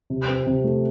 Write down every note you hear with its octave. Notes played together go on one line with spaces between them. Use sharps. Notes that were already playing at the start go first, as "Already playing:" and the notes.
C3
C4
C3
A3